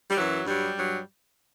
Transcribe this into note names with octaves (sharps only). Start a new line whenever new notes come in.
G3
F#2 E3 F#3
G2 F#3 G3
G2 F#3